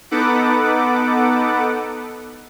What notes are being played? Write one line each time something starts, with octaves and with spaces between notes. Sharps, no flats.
B3 D#4 A4 B4 F#5 D6